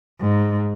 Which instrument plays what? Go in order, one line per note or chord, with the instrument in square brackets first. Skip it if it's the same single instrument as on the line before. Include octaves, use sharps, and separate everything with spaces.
[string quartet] G#2